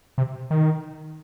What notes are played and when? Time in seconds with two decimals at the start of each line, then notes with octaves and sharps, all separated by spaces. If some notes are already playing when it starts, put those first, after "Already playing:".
0.18 C3
0.50 D#3